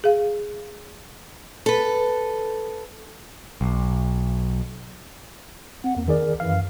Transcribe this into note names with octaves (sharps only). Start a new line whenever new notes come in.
G#4 F5
A4 B4
B1
C4 F#5
E2 A#3
D#3 G#4 A#4 D5
F#2 E3 F5